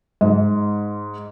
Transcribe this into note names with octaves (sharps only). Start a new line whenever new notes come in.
G#2